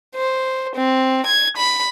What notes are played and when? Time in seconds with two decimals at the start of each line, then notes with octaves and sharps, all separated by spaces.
0.15 C5
0.76 C4
1.26 G#6
1.57 B5